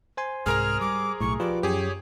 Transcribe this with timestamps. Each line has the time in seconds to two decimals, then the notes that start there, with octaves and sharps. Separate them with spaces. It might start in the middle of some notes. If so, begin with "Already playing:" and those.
0.17 C5 G#5 C6
0.46 C2 G#2 G#4 A#4 A#5 F6
0.81 G3 D6
1.20 B1 A2 C#6
1.40 F3 F4 G4 B4 D5
1.63 F#2 G4 G#4 C#5